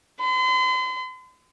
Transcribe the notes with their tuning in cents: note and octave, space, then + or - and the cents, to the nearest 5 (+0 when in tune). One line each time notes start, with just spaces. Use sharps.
C6 -40